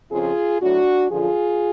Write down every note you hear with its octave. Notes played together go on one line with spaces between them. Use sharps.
F2 C#3 F3 F4 G#4
A2 F#3 D4 F#4
F#2 D3 F3 F4 G#4